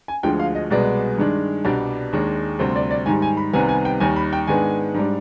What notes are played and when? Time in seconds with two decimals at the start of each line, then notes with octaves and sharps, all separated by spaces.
0.08 G#5
0.23 D2 D3 F3 G#3 G5
0.39 F5
0.55 D#5
0.70 C2 B2 G#3 B3 D5
1.18 G2 D#3 G#3 D4
1.65 C2 B2 G3 D4 D5
2.13 D#2 D#3 G#3 D4
2.59 D2 C3 G3 C4 C5
2.76 D5
2.91 D5
3.06 G#2 D#3 G3 G#5
3.22 G#5
3.37 B5
3.53 C2 C3 D#3 G3 B3 G#5
3.69 G#5
3.85 G5
4.00 D#2 D#3 G3 G#5
4.16 B5
4.33 G5
4.47 G#2 D#3 G#3 B3 D4 G#5
4.94 G#2 G3 D4